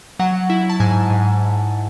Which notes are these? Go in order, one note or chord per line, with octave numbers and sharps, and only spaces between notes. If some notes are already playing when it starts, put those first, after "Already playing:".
F#3 F#5
E4
A5
G#2 G#5
G#2